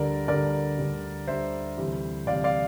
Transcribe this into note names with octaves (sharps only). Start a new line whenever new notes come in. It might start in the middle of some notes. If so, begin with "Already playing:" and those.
Already playing: D2 D3 G3 A#4 D5
D2 D3 G3 A#4 D5
D2 D3 G3
D2 D3 G3 C5 E5
D2 C3 E3 G3
D2 C3 E3 G3 D5 F5
D5 F5